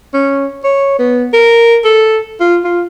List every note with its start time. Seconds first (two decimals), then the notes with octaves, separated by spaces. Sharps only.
0.14 C#4
0.64 C#5
0.99 B3
1.33 A#4
1.84 A4
2.41 F4
2.64 F4